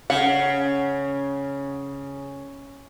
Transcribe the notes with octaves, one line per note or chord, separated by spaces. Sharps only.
C#3 F#5